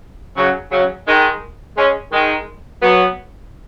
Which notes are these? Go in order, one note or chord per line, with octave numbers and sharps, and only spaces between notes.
C#3 F#3
C#3 F#3
D#3 G#3
G#3 C#4
D#3 G#3
F#3 B3